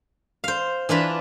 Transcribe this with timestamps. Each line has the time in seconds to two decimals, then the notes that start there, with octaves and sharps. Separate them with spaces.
0.44 C5 F5
0.89 E3 D4 F4 B4